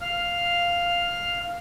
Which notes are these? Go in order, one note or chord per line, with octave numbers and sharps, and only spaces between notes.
F5 F6